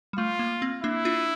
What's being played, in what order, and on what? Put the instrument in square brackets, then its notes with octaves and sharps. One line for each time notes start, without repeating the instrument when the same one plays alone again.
[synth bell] G3
[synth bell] A3 [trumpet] F4
[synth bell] A#3
C4
[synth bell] A#3 D4 [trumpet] E4
[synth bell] D4 F4